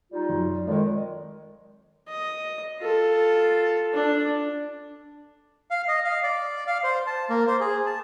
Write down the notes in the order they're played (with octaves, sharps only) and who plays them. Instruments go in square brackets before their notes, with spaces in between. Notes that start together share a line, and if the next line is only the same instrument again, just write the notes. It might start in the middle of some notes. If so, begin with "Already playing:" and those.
[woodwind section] G3 D#4 F4
[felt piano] F#2
[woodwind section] F2 D#3 G#3 [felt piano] D5 D#5
[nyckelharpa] D#5
F4 A4
D4
[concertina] F5
D#5
F5
D5
F5
C5
A5
A#3
C5
G#4
A5